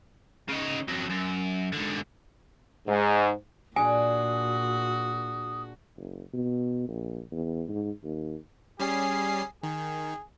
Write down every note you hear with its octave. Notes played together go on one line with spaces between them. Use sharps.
C#3 D#4
F2 F#3
F#2
G#2 D3
G#2
A#2 D4 F#4 G#4 G#5 D#6
F#1
B2
A#1
E2
G#2
D#2
G3 C#4 G#4 C7
D#3 G#4